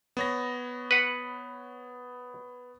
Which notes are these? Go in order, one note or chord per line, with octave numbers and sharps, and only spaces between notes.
B3 C#5 A#6
B4 F#5